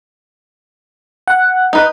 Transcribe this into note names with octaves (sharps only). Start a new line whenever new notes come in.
F#5
D#4 B4